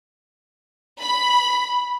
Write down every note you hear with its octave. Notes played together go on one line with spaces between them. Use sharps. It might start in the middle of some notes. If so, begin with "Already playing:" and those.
B5